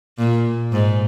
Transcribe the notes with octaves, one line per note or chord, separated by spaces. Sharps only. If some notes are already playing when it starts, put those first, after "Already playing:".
A#2
G#2